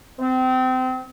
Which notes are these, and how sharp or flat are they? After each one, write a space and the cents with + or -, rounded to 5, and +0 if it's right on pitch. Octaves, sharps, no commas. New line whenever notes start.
C4 -30